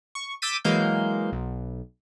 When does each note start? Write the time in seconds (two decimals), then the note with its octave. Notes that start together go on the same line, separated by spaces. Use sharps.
0.15 C#6
0.42 D6 E6 G6 A6 B6 D#7
0.64 E3 F#3 G#3 A#3 F5 G6
1.32 B1